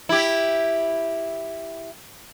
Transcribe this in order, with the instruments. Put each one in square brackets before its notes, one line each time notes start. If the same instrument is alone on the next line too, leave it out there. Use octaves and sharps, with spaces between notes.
[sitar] E4 G4